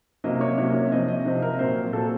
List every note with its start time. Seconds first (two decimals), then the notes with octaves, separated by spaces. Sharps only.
0.24 C3 F#3 A#3 C#4 D#5
0.41 C#5
0.58 C3 F#3 A#3 C#4 C#5
0.91 C3 F3 C4 D#5
1.08 D#5
1.25 C3 F3 C4
1.42 A#4
1.59 A#2 F#3 C4 C5
1.93 A#2 F#3 C4 A4